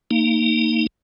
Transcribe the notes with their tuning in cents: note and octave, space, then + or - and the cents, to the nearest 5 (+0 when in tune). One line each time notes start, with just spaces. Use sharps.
A#3 -25 D#4 +5